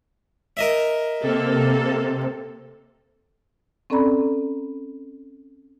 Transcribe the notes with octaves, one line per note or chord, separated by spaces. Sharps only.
A#4 D#5 E5
C3 A#3 A4
C4 C#4 A4 D5 A#5 B5